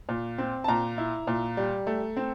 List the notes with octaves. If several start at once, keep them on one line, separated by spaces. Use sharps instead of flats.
A#2
C4
A5
A#2 A#5
E4
A#2
G3
A3
C4